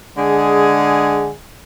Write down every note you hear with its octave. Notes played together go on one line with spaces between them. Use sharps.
D3 G#3 G#4